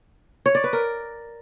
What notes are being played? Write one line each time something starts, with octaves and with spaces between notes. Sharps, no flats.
C#5
D5
B4
A#4